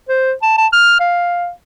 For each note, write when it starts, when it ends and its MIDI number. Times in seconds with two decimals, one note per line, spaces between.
0.09 0.33 72
0.42 0.56 81
0.58 0.67 81
0.73 0.97 89
1.00 1.50 77